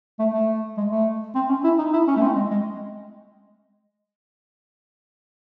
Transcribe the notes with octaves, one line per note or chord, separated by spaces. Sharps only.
A3
A3
G#3
A3
C4
C#4
E4
D#4
E4
C#4
A3
C4
G#3
G#3